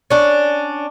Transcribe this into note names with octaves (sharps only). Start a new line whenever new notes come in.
C#4 D4